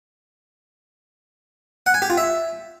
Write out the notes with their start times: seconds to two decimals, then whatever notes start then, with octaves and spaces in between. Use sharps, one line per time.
1.86 F#5
1.94 G#5
2.02 G4
2.10 F4
2.18 E5